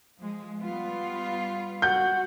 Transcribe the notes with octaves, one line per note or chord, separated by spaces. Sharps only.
F3 G#3
G3 B3 F4
F#4 G6